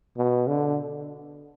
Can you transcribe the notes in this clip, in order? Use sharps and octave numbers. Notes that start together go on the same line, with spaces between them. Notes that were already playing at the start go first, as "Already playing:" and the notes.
B2
D3